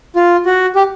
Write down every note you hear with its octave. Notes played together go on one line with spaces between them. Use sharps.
F4
F#4
G4